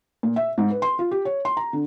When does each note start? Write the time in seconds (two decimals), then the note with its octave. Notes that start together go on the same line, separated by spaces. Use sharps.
0.23 A#2
0.36 E5
0.58 G#2
0.71 B4
0.82 C6
0.99 F4
1.11 G4
1.25 C#5
1.45 C6
1.57 A#5
1.73 D3